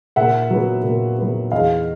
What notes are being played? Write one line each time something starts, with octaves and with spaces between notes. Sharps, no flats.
A#2 E5 F#5
F#3 B3
A#2
F#3 B3
E2 D#5 F5